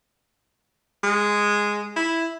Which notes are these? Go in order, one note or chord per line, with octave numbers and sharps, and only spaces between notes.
G#3
E4